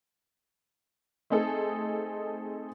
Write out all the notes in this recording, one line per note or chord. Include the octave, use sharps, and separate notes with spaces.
A3 C4 D#4 G#4 A4